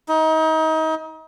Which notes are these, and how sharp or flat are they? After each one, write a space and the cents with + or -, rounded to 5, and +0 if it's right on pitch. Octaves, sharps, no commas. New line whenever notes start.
D#4 +30